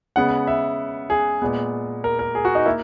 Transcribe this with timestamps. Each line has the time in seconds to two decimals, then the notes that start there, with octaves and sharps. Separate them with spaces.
0.16 C#3 G#3 B3 F#5
0.47 E5
1.10 G#4
1.42 A#2 G#3 B3
2.04 A#4
2.19 A#4
2.35 G#4
2.45 F#4
2.55 D#4
2.66 A#3 E4